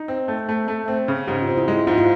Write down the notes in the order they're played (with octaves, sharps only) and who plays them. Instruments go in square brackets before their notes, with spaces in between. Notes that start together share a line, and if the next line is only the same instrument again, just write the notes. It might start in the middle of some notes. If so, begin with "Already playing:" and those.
Already playing: [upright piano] D#4
C4
A3
A3
A3
C4
C#3
[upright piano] G#2 [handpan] G4
[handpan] F4
[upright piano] C4
[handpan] E4
[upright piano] G#3 [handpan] E4
[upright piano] G#2 [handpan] F4
[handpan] F4